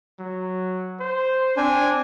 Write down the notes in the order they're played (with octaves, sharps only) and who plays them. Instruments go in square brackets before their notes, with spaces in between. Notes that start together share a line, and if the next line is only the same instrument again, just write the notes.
[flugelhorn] F#3
C5
[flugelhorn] C4 [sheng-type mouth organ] D4 G#5